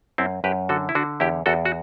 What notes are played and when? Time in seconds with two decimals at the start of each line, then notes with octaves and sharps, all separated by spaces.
0.18 F#2 C4 E4
0.44 F#2 G4 B4
0.69 D3 F#4 A4
0.89 E4
0.95 D3 D4 F#4
1.20 E2 E4 G4
1.46 E2 F#4 A4
1.65 F#4